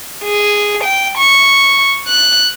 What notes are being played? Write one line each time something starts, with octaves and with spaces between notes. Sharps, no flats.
G#4
G5
C#6
F#6